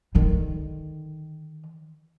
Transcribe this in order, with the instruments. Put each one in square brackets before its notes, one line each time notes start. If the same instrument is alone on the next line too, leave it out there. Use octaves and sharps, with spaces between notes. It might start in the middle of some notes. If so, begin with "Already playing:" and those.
[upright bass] D3 D#3